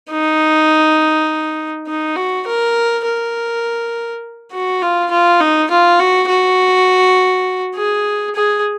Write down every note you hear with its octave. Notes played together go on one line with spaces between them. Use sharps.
D#4
D#4
F#4
A#4
A#4
F#4
F4
F4
D#4
F4
F#4
F#4
G#4
G#4